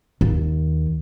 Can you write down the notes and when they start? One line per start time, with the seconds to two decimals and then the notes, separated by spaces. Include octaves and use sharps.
0.21 D#2